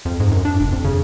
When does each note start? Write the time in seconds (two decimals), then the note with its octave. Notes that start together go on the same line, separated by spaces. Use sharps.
0.05 F2
0.20 G#2
0.31 F#2
0.45 D4
0.60 F1
0.72 F2
0.84 C#3